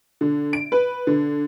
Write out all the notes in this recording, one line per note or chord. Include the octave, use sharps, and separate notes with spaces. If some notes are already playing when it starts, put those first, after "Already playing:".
D3
D7
B4
D3